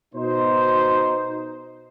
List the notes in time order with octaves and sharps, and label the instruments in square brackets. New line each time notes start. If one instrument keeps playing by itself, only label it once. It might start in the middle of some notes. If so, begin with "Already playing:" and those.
[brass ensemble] B2 D#4 C5